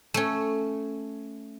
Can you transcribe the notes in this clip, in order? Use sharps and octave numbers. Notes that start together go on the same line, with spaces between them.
A3 C#4